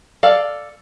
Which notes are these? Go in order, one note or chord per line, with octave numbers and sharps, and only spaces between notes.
A4 D5 F5